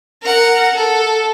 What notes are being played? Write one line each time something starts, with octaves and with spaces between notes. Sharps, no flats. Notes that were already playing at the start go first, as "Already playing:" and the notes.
A#4 F#5
A4